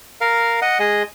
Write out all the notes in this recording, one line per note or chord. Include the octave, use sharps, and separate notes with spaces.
A#4 F5
D#5 F#5
G#3 G#4 D#5